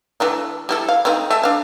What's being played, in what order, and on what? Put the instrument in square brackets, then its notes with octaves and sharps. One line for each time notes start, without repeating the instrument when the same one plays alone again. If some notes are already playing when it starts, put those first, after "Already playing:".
[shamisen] E3 A3 D4
G3 E4 A4
F5
A3 C4 D#4
A3 E5 A5
D4 F5